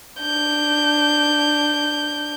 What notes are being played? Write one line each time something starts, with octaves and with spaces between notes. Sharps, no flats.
D4 G6